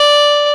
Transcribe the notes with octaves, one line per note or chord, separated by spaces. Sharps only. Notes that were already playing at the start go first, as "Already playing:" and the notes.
Already playing: D5